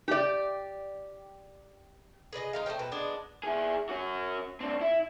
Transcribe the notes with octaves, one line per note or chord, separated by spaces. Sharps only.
G4 D5
G#4 B4 D5 D#5
G#3 D#4 F5
A3 C5 C#5 G5
B2 B4
G#3 B3 D4
E4 G#4
C#4 F#4
C4 D4
E4